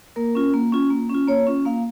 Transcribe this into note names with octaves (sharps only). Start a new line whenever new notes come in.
A#3 A#4
C#4 F4
A#3
C#4 F4
A#3
C#4 F4
A#3 C#5
C#4 F4
A#3 F5